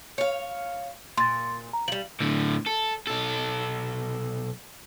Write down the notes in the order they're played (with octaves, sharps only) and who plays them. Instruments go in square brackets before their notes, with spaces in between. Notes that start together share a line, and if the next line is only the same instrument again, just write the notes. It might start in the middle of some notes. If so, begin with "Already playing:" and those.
[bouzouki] C#5 F5
[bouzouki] A#2 [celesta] C6 A6
[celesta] A#5
[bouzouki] F3 G3 [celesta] F#7
[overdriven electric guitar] A2 D3
A4
B1 A4